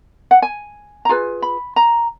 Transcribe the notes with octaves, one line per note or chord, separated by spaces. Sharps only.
F#5
G#5
A#5
F4 G#4 B4 G#5
B5
A#5